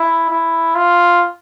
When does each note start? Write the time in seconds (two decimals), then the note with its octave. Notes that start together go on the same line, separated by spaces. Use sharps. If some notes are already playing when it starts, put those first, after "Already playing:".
Already playing: E4
0.31 E4
0.76 F4